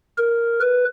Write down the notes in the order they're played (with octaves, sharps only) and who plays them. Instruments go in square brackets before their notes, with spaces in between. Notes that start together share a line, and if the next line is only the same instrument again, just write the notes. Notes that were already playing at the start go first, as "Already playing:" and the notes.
[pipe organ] A#4
B4